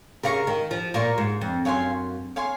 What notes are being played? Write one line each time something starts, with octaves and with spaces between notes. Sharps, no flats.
C#3 A#4 F5 A#5 C#6
D#3
F3
A#2 A#4 F5 A#5 C#6
G#2
F2
F#2 C#5 F5 G#5 C6
C#5 F5 G#5 C6